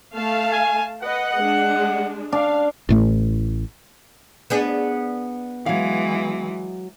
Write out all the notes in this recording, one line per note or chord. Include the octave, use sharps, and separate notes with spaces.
A3 F5 A5
G#5
B4 D#5 F#5
G#3 D4
D4 F5
A1 A2 A3
B3 D4 G#4
E3 F#3 G#3 F5